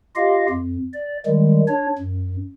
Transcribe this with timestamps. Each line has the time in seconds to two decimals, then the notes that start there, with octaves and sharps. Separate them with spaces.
0.16 F4 G4 D#5 F5
0.50 F2
0.93 D5
1.26 D#3 G3 G#3
1.68 D4 C#5
1.98 F#2